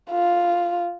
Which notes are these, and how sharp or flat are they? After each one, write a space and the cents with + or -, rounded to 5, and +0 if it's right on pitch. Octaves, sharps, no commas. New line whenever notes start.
F4 +0